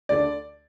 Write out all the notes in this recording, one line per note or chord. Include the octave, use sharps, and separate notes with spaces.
D2 D3 A3 D5